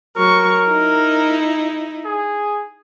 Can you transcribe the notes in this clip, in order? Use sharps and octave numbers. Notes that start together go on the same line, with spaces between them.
F#3 A#4 C#6
D#4 E4
G#4